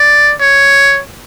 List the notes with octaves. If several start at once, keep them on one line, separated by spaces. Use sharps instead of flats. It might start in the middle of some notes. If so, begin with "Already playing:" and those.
Already playing: D5
C#5